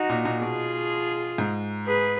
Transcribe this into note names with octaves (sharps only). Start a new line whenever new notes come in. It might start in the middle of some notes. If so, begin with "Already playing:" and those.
Already playing: D#4 F#4
A#2
A#2
B2 F4 G#4
G#2
G#4 B4